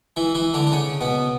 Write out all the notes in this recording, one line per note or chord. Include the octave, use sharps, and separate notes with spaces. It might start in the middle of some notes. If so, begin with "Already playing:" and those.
E3 E4
E3 E4
D3 D4
D4
C#3 C#4
B2 B3